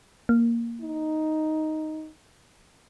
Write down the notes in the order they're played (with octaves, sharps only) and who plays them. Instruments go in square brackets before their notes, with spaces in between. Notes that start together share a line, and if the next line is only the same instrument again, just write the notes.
[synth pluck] A#3
[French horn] D#4